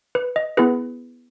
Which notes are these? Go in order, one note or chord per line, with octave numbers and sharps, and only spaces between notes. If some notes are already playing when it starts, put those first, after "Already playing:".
B4
D#5
B3 E4 G#4 B4